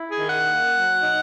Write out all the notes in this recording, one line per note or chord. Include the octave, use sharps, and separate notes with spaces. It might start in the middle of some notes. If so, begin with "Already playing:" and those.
Already playing: E4
G#4
D#3
F#5
A#3
F#3
D#4